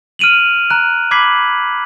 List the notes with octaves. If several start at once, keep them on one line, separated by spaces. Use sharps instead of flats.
F6 D7 D#7 F7 F#7
A#5 F#6 D7
B5 D6 G#6 B6 C7 F#7